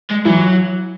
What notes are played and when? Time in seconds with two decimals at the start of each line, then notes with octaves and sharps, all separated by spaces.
0.10 G#3
0.25 E3 F#3